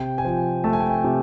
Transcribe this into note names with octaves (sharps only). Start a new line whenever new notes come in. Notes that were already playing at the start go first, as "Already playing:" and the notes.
Already playing: C3 G5
G#5
F3 G5
A3 A5
G#5
G5
G#5
C3